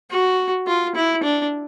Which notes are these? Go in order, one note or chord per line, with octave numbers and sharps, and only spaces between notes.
F#4
F4
E4
D4